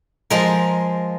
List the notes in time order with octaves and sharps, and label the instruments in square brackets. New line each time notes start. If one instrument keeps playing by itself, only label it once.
[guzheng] F3 G#3 A#4